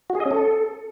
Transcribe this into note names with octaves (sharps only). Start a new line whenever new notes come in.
F#4
G#4
D#5
C#4
A4